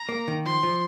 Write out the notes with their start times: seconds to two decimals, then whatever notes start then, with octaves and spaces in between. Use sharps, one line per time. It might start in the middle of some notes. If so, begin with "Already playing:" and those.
Already playing: A#5
0.09 A#3
0.28 D#3
0.46 F3 C6
0.63 F3